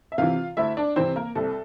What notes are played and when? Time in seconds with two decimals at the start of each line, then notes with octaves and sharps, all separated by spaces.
0.12 E5
0.18 C3 E3 F4 F5
0.57 D2 E4 E5
0.77 D4 D5
0.96 C3 E3 C4 C5
1.16 A#3 A#4
1.35 C2 A4